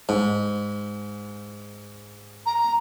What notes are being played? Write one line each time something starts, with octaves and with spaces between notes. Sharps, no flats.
G#2
A#5